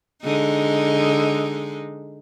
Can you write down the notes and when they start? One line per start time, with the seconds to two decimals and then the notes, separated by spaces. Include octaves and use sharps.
0.23 D3 G#3 D#4